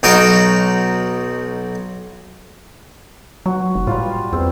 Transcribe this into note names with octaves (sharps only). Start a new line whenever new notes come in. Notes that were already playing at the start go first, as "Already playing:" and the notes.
B1 D#4 F#4 G5
F#3 F#4
F1
A2 G3 F4
E2 C4